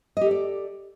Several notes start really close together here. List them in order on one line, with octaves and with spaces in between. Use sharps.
D#5 G4 A4 D5